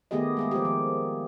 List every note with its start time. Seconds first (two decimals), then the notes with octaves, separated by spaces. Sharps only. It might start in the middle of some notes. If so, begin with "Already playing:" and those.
0.11 D#3 A3 B3 G4 G#4 D#5
0.37 G#3 A#3 G#4
0.51 F3 G4
0.65 D#3